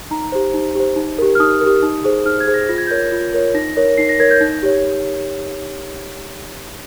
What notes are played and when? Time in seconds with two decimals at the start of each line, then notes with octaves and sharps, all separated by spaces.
0.11 D#4 A#5
0.32 G4 C5
0.54 D#4
0.75 G4 C5
0.96 D#4
1.18 G4 A#4
1.35 F6
1.40 D#4 D#6
1.61 A#4
1.66 G4
1.83 D#4
2.04 G#4 C5
2.25 D#4 F6
2.40 G#6
2.47 G#4 C5
2.54 A#6
2.69 F4 A#6
2.78 G#6
2.87 A#4 C#5 G6
2.96 G#6
3.12 F4
3.34 A#4 C#5
3.54 D#4 A#6
3.77 A#4 C#5
3.98 D#4 C7
4.09 A#6
4.20 A#4 C#5 G#6
4.31 G6
4.41 D#4
4.63 G4 C#5